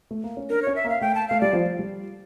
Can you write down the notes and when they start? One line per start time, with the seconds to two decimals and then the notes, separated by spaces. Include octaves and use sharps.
0.11 A3
0.24 A#3
0.37 C#4
0.50 D4 A#4
0.62 C#4 C#5
0.76 E5
0.84 A#3
0.89 F5
1.01 A3 G5
1.15 A5
1.28 A3 F5
1.41 G3 D5
1.53 F3
1.79 G3